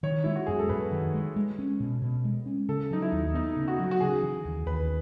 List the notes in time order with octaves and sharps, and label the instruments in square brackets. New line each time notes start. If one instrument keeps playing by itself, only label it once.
[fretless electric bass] D#3 [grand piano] C#5
[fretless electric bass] G#3 [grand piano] E4
[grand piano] F#4
[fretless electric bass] F#2 [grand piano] G#4
[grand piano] A4
[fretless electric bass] F#2 [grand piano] B4
[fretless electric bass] D#3
G#3
G#3
C#4
B2
B2
G#3
C#4
[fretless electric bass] C#3 [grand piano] A4
[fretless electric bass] F#3 [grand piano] D#4
[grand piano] E4
[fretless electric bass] D#2
[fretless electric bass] B3 [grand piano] D#4
[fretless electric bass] C#3
[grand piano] F#4
[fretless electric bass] F#3
[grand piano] F#4
[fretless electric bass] C#3 [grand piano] G#4
[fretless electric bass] E3
D#2
[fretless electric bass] D#2 [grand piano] B4